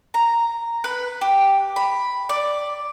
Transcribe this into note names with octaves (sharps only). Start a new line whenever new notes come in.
A#5
B4
G4
B5
D5